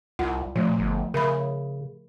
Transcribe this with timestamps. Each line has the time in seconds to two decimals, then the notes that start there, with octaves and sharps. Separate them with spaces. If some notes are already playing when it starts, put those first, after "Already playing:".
0.19 C2 F4 F#5
0.56 A#2 F3 A3
0.79 G1
1.14 C#3 A#4 E5 B5